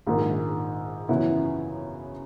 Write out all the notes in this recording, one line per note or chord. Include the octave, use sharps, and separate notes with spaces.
A#1 G#2 D#3
F#2 C#3 E3 B3 E4